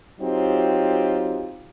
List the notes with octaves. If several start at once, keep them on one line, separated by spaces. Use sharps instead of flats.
F#3 C4 D#4 F4 G4